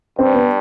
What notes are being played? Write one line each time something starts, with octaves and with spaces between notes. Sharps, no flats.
G2 C4
B3